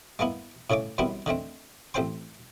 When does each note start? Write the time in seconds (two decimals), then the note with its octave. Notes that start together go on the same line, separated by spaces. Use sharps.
0.19 G#3 A#3 B3 E4
0.70 A2 C#3 C#5 E5 D6
0.98 F#2 D#3 G3 B3 C4 E4
1.26 D3 D#3 A3 C4
1.94 A1 C4 A4 C5 G5 C6